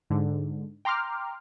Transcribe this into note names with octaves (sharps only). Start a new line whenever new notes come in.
G#2 D3
G5 A#5 C6 D6 F6